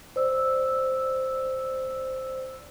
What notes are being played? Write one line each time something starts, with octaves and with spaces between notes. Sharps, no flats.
C5 D5 E6